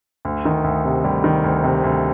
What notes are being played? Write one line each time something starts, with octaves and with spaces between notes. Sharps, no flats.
D2
D#3
D2
C3
D2 G3
D#3
D2
C3
D2